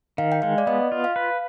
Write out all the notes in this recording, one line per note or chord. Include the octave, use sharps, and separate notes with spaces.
D#3 F5
G5
G#3 F5
D5
B3 D#5
F4
F5
B4